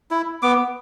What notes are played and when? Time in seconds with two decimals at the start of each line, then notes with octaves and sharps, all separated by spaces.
0.11 E4
0.42 B3 D6